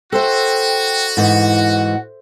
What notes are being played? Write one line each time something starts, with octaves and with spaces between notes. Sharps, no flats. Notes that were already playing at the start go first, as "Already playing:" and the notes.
F#4 A4 C5 E5 G5
G#2 E3 F#5